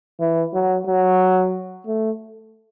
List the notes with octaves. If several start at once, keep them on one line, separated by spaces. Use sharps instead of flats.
E3
F#3
F#3
A3